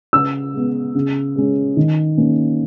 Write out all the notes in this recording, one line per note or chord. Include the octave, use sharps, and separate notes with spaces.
C#3 E6
G#3 B3
C#3
G#3 C#4
D#3
A#3 C#4